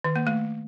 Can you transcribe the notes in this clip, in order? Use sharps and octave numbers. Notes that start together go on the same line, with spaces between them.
D#3
A#3
A3